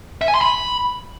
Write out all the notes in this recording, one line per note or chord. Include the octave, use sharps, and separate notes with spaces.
E5
G#5
C6
B5